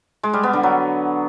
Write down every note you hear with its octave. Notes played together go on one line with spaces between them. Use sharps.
G#3
G3
B3
D3
F#3